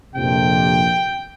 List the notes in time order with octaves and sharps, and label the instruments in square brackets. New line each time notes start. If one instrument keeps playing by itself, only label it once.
[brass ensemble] A#1 F2 C3 [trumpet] G5